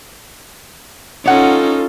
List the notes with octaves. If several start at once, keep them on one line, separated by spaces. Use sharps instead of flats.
C#4 D#4 F4 A4 C#5 F#5